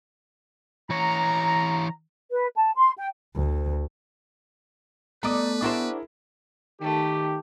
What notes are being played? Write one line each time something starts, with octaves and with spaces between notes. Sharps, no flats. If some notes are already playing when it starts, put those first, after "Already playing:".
E3 C#5 A#5
B4
A5
C6
G5
D2
A3 B3 B4 D5 A#5 D#6
D4 E4 F#4 G#4 A#4 C5
D#3 A3 G4